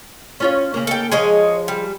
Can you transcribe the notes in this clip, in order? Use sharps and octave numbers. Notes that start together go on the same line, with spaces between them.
C#4 F4 C#5
C#3 A#3
A4 G5
F3 G#3 G#4 C#5 D#5
G3